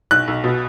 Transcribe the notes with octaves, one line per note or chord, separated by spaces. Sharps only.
B1 F#6
B1
B2